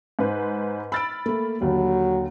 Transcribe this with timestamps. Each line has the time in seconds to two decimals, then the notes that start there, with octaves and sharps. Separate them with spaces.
0.19 G#2 B4 C5
0.92 B5 E6 F6 A6 D7
1.26 A3 A#3
1.62 D#2 D3 F#3